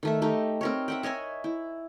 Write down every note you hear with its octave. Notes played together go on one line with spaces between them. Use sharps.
D#3 A3 E5
A3 D#4 G4
C4 A#4 C#5
E5 F#5 G5
C#5 D#5 E5 G#5
E4